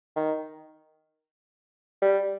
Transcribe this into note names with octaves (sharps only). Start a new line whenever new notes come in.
D#3
G3